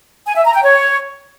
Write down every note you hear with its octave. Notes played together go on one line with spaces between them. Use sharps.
G#5
E5
A#5
G5
C#5